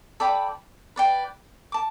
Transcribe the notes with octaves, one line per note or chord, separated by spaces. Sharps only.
A4 D5 G5 B5
B4 D5 G5
A5 D6